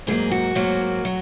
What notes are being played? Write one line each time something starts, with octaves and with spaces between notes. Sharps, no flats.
G#2 F#3 A#3 G#4
F#4
G#2 F#3 A#3
F#3